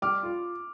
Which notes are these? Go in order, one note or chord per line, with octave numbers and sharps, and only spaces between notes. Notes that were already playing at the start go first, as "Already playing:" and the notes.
G3 D6 F6
F4